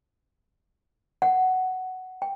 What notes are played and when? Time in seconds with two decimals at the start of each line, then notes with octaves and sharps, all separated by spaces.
1.22 F#5
2.22 G5